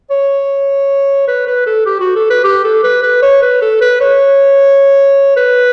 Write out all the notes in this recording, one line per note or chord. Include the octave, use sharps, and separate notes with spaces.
C#5
B4
B4
A4
G4
F#4
A4
B4
G4
A4
B4
B4
C#5
B4
A4
B4
C#5
B4